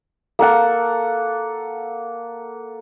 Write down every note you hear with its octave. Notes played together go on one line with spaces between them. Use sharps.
A#3 A4 F#5